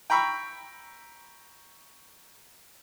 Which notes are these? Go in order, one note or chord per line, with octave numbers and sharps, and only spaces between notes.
G5 A#5 B5 C#6 E6